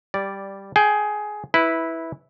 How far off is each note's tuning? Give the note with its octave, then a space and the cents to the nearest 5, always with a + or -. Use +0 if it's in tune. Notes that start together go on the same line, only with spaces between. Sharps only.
G3 +0 D5 -5
G#4 +15 G5 +0
E4 -10 B4 +0